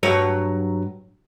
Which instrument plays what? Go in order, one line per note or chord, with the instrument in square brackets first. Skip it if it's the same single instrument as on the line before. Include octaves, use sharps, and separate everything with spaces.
[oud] G2 F#3 C#5